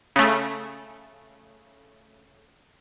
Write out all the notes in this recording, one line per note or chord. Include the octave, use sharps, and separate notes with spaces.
C#3 A3